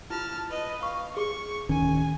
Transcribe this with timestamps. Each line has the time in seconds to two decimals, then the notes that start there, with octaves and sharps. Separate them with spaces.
0.10 E4 F4 A5 F6
0.51 B4 D#5
0.83 F5 C#6
1.17 G#4 C#6
1.69 D1 D#3 C#4 G#5